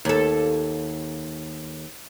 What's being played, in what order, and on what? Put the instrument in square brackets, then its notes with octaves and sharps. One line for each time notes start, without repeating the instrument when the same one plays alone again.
[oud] D#2 A4